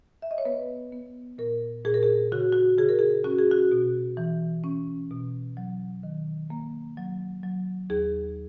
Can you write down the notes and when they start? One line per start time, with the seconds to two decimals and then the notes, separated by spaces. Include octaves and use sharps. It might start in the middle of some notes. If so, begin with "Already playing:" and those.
0.22 E5
0.31 D#5
0.38 C#5
0.45 B3 B4
0.92 B3
1.38 A#2 A#4
1.85 A#2 G#4
1.94 A#4
2.03 G#4
2.32 C#3 F#4
2.52 F#4
2.78 C#3 G#4
2.89 A#4
2.99 G#4
3.24 C#4 F#4
3.39 G#4
3.52 F#4
3.72 B2
4.17 E3
4.64 C#4
5.11 B2
5.57 F#3
6.03 D#3
6.50 A#3
6.97 F#3
7.43 F#3
7.90 D#2 G#4